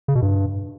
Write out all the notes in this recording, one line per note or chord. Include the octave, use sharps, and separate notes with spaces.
C#3
B2
G2